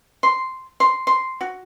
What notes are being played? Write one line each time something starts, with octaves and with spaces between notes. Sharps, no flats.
C6
C6
C6
F#4